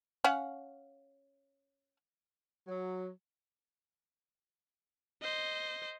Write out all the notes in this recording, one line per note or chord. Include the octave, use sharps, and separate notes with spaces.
C#4 F5 F#5
F#3
C5 D#5